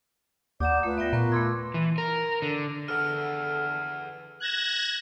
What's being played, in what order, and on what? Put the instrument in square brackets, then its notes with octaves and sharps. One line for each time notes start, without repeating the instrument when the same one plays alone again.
[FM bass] D#2 [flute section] D5 F#5 G6 [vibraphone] A#5 D#6 [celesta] D6 E7
[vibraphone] A3 [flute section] F4 B4
[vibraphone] B3 D5 G5 [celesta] E5 A#6
[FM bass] A#2 [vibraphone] B3 A#4 C#6 [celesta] A#5
[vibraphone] A3 B5 E6 [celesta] C6 D6 G#6
[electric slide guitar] E3
A#4
D3
[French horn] D3 [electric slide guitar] G#4 B4 F#5 [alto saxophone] A4 [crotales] F6
[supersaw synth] F#6 G#6 A#6 E7